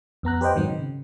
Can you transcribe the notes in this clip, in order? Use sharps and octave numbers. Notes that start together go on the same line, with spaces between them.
F2 B3 A#5 F#6
G4 B4 C5 D#5 G5
G#2 D#3 F#3 C4
C#3